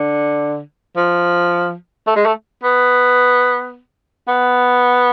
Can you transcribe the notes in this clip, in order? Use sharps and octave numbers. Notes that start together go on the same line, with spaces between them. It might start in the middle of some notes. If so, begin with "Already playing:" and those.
Already playing: D3
F3
A3
G#3
A3
B3
B3